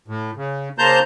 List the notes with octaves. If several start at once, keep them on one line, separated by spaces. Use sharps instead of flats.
A2
C#3
C#3 A#3 C5 A5 A#5 G6